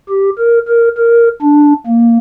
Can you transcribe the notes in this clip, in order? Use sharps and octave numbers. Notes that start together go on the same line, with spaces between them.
G4
A#4
A#4
A#4
D4
A#3